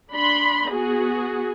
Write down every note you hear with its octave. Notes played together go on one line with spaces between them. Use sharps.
D4 B5 C6
B3 F#4 G#4